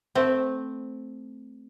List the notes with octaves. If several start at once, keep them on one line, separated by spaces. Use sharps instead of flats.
A3 C4